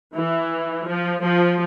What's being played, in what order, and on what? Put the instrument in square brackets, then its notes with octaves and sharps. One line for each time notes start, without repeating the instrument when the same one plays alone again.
[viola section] E3
F3
F3